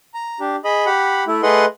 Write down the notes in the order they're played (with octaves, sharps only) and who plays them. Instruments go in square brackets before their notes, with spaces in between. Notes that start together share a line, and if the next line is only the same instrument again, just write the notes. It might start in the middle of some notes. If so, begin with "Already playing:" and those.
[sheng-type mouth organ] A#5
D4 G4
G#4 D#5 B5
G4 F#5 B5
A3 E4
A3 G#4 B4 D#5 F#5 C6